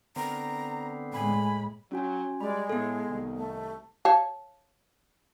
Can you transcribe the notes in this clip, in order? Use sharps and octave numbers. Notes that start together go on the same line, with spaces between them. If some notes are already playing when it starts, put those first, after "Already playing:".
D3 B3 C4 A#5
A2 G#3 G#5 B5
F#3 C#4 F#4 G#5
G3 G#3 D5 B5
A2 B3 A4
C2 D#3
A3
C#5 F5 A5